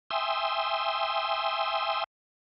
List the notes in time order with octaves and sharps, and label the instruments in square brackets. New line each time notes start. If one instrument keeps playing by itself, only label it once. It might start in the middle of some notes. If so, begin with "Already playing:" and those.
[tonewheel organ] E5 G5 G#5 C6 D#6 E6